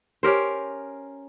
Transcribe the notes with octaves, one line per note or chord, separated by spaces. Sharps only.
C#4 G4 A#4 C5